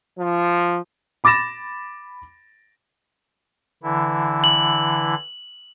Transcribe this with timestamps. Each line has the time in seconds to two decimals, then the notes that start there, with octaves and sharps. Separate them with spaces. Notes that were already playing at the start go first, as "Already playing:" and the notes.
0.19 F3
1.24 B5 D6 A6 A#6 E7
3.83 D3 E3 E4
4.44 F#7